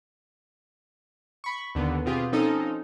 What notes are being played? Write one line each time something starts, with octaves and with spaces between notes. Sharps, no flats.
B5 C#6
D#2 D3 B3
B2 C4 F4 G4 G#4
F3 C4 C#4 D#4 A4 D#5